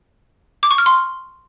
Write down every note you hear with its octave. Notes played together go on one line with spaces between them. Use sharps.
D6
C#6
F6
C6